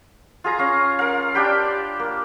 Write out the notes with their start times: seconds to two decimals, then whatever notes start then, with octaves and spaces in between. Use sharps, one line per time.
0.44 F4 G#4 A#5
0.59 C#4 F5
0.99 A#4 F5
1.34 D4 G4 G5 B5
1.99 A#3